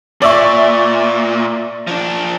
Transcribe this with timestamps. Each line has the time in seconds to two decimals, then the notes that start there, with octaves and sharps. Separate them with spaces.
0.22 A#2 D5 E5 C#6
1.87 F3 D4